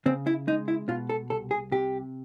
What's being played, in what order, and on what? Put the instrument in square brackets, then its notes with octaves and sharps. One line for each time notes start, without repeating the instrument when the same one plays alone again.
[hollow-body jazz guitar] C#3 C4
E4
G#3 D#4
E4
B2 F4
A4
C2 A4
G#4
C3 G4